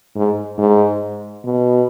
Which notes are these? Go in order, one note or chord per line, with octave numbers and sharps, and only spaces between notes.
G#2
G#2
B2